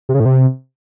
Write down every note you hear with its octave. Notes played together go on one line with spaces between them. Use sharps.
C3
C#3
A2
C3